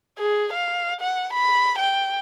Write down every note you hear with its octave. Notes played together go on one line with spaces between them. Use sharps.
G#4
F5
F#5
B5
G5